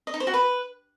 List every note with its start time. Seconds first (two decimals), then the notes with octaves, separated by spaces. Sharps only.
0.07 D#5
0.14 D#4
0.20 C5
0.27 F#4
0.34 B4